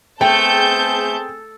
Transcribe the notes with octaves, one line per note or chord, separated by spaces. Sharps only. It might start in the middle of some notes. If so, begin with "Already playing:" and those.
A3 B3 C4 G#4 G5 A5 G6